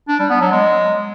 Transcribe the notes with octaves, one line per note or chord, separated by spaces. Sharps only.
D4
G3
B3
F#3
G#3